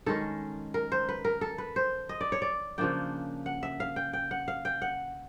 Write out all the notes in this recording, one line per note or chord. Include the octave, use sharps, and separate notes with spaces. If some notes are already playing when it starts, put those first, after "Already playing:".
D#3 G#3 C#4 A4
A#4
C5
B4
A#4
A4
B4
C5
D#5
D5
C#5
D5
C#3 F3 A#3 D4 G5
F#5
E5
F5
G5
G5
F#5
F5
G5
F#5